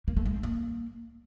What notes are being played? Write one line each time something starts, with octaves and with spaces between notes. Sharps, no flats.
A#3
A3
G#3
C4
A#3